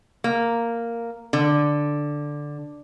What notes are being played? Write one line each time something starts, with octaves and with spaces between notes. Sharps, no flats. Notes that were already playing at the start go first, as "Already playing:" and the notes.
A#3
D3